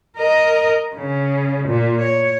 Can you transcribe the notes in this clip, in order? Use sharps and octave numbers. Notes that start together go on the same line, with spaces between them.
A#4 D#5
C#3
A#2
C#5